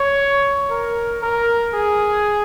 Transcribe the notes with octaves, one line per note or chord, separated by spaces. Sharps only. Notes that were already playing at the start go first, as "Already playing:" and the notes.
Already playing: C#5
A#4
A#4
G#4